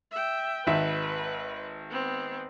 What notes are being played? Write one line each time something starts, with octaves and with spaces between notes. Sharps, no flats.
E5 G5
G#1 B4 E5
B3 C4